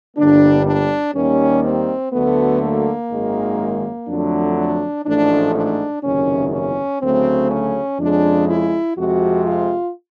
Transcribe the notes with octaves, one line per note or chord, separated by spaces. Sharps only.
G1 G2 D3 G3 A#3 D4
D4
D#2 D#3 G3 A#3 C#4
C4
D2 D3 F#3 A3 B3
A#3
G#1 F#2 D#3 G#3
F2 D3 F#3 A3 D4
D4
A1 G#2 F3 A3 D4
D4
F#1 E2 C3 D#3 C#4
C#4
D2 C#3 F#3 A3 C4
C#4
F2 C#3 F3 G#3 D4
E4
F2 C3 F3 G#3 F#4
F4